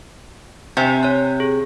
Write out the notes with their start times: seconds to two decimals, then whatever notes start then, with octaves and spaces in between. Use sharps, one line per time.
0.77 C3 C5 E5 G#5
1.03 C#5 F#6
1.40 G#4